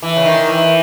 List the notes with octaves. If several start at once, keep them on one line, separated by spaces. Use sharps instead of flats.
E3
C#3
D#3
E3